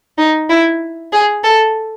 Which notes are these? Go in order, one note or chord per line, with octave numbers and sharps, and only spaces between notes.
D#4
E4
G#4
A4